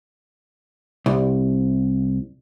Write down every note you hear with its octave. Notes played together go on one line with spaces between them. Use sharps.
C2